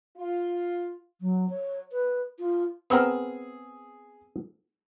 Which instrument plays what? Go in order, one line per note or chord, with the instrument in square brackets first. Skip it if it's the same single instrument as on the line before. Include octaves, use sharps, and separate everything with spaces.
[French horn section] F4
[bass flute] F#3
C#5
B4
F4
[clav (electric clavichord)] B3 C4 A#4 [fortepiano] G#4 E6